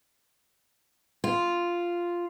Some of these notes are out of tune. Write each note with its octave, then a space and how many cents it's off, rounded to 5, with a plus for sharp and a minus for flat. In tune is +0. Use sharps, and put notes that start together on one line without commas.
F4 -5